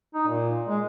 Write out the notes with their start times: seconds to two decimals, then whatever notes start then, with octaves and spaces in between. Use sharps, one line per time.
0.14 D#4
0.27 A#2
0.68 G#3